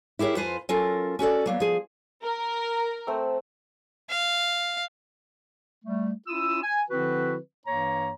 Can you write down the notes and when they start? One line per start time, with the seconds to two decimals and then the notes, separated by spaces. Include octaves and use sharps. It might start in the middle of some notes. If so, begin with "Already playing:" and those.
0.19 E4 G4 G#4 A#4 C#5
0.36 F2 F4 B4 C5 G#5
0.69 F#3 C#4 F4 A4 A#4
1.19 C#4 F#4 A4 D5
1.46 F#3 A#3 B3
1.60 F3 G#4
2.22 A#4
3.07 A3 C4 E6
4.10 F5
5.85 G3 A3
6.27 C#4 E4 F4 D#6 E6
6.63 G#5
6.90 D3 F3 C4 E4 F#4 B4
7.67 G2 E3 A#3 C#5 A#5